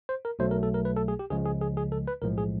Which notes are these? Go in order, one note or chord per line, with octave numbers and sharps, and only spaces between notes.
C5
A#4
B1 B2 F#3 A3 C5
A#4
A4
A#4
B4
A4
G#4
G4
C#2 C#3 F3 G#3 G#4
G#4
G#4
G#4
A4
B4
B1 A2 F3 G#3 A#4
G#4